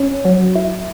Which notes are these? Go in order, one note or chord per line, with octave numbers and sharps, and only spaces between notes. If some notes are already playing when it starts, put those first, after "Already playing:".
Already playing: C#4
F#3
E4